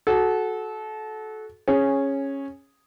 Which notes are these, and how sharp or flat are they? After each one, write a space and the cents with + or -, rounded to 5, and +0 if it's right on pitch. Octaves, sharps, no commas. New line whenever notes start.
F#4 +0 A4 -25
C#4 -10 G#4 +0